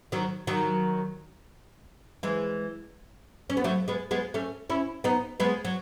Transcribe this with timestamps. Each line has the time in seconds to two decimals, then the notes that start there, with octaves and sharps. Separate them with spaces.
0.12 D#3 F#3
0.47 D#3 F#3
2.23 E3 G#3
3.50 C#4
3.57 B3
3.64 F#3 A3
3.88 G#3 B3
4.11 G#3 B3
4.34 A3 C#4
4.70 C#4 E4
5.04 B3 D#4
5.40 G#3 B3
5.65 F#3